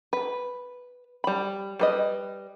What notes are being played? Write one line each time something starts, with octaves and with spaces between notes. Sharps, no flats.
B4
G3 B5
G3 B4 D#5